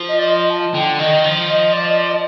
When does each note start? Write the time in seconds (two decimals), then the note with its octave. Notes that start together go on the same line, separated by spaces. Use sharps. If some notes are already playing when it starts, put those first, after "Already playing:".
Already playing: F3
0.08 D#5
0.18 D5
0.25 D#5
0.49 A5
0.74 D3 G5
0.99 D#3 D#5
1.24 F3
1.49 D#5
1.72 D5
1.85 D#5
1.97 D5
2.10 D#5